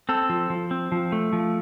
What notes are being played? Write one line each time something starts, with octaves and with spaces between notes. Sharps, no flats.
C4 A4
F3
F3
C4
F3
A3
F3